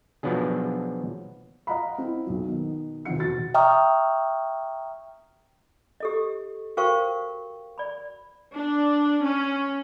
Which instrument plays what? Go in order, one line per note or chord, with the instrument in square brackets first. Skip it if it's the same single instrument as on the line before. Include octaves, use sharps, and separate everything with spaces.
[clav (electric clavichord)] B2 F3 F#3 B3 D4 G#4
[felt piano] D#5 F5 F#5 A#5 B5
C4 E4
B1 B2 F#3
B2 D#3
E1 C3 D#3 F3 F#5 C#7
E1 F#4 A6
[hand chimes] E5 G5 A#5 C#6 D#6 F6
[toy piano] G4 A4 D#5
F#4 A#4 C5 F5 G5 C#6
D5 B5
[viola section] D4
C#4